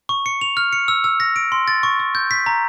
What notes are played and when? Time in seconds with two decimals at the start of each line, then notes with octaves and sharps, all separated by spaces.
0.09 C#6
0.26 C#7
0.41 F7
0.57 F6
0.73 C#7
0.88 E6
1.04 E6
1.20 A#6
1.36 D7
1.52 C6
1.68 A6
1.83 C#6
2.00 C#6
2.15 G6
2.31 B6
2.46 A#5